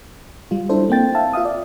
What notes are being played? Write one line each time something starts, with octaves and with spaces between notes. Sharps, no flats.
G3 F4
D4 E4 A4 C5
A#3 C4 G5 A6
E5 F5 A5
F4 E5 F5 D#6
D5